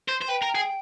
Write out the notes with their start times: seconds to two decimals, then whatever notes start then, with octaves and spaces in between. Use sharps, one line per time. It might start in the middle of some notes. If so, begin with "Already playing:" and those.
0.08 C5
0.21 C5
0.28 B4 G5
0.42 A#4
0.55 G#4